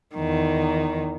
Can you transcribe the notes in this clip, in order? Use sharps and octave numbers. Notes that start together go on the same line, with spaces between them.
E2 D#3